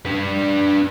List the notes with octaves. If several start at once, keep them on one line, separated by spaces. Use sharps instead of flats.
D4 B4